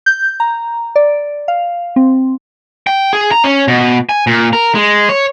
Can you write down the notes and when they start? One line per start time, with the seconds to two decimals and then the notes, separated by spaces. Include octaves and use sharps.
0.06 G6
0.40 A#5
0.96 D5
1.48 F5
1.96 C4
2.87 G5
3.13 G#4
3.32 A#5
3.44 C#4
3.68 B2
4.09 G#5
4.27 A#2
4.53 A#4
4.75 G#3
5.09 C#5